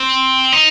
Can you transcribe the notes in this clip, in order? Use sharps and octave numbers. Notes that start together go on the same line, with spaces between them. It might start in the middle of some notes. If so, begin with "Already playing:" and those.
Already playing: C4
D#4